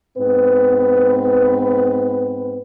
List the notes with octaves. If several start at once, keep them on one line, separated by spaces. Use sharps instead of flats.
G#2 B3 C4 B4